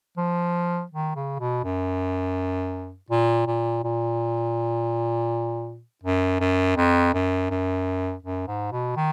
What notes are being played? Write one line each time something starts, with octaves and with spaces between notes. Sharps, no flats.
F3
D#3
C#3
B2
F#2
A#2
A#2
A#2
F#2
F#2
F2
F#2
F#2
F#2
G#2
B2
D#3